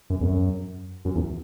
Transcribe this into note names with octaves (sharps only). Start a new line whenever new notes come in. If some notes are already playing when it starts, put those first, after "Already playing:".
F#2
E2
F#2
F#2
E2